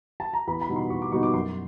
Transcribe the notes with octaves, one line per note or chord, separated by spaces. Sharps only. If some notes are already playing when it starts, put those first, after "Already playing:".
A5
A#5
E2 B5
B5
B2 G3 B3 D#4
C6
E2 C#6
D6
B2 G3 B3 D#4 C#6
D6
F#2 C6